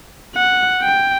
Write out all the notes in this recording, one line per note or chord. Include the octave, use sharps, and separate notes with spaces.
F#5
G5